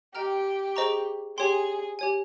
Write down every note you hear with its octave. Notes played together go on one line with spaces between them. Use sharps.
G4 D#5 G5 A#5 F6
G#4 C5 D#5 A#5 C#6
G4 G#4 C#5 G5 C6
G4 C#5 G#5